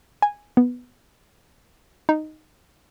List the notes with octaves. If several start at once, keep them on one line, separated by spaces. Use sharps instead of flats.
G#5
B3
D#4